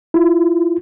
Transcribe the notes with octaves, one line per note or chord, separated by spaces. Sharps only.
E4 F4